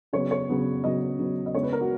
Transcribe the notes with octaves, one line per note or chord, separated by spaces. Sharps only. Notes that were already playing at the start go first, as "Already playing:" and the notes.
C#3 F#3 B3 C#5
C#5
C#3 F#3 B3
C#3 F#3 B3 D#5
C#3 F#3 B3
D#5
C#3 G#3 B3 C#5
B4
A#4
F#4